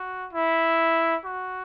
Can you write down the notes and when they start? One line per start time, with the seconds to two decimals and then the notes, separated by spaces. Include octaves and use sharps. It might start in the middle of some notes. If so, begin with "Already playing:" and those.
Already playing: F#4
0.33 E4
1.25 F#4